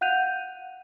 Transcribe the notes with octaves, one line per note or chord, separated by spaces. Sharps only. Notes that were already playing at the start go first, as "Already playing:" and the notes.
F5 F#5 F#6 G6 D#7 F7